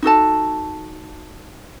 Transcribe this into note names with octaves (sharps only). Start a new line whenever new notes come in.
D#4 F#4 A4 A5